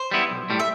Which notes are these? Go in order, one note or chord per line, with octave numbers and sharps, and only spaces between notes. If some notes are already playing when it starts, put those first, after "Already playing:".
Already playing: C5
G3 B3 E4
B1
A2 G3
E5